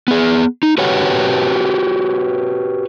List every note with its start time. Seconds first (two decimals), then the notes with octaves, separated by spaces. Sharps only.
0.08 B3 G#4
0.63 D#4
0.78 F#4 G4 B4 C#5 F#5 G5